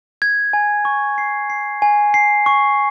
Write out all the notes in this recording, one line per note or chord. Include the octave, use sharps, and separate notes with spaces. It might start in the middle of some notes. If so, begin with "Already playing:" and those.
G#6
G#5
C#6
C7
C7
G#5
C7
C#6